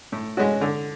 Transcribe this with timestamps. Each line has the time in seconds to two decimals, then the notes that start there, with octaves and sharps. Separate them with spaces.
0.12 A2
0.37 G#3 C#4 F#4
0.61 D3